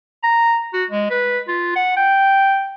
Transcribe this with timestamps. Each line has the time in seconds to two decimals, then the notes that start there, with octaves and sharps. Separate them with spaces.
0.23 A#5
0.73 F#4
0.90 G#3
1.10 B4
1.48 F4
1.76 F#5
1.97 G5